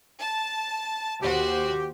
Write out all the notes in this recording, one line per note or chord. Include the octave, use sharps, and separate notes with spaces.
A5
D#2 F#4 G4 C5